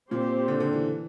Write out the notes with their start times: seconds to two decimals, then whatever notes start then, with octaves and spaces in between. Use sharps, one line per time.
0.11 A#2 C4 G4 C5
0.48 D3
0.60 D3
0.73 E3